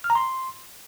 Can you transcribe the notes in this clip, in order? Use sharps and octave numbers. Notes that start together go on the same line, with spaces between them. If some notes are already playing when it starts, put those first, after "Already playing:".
F6
A#5
C6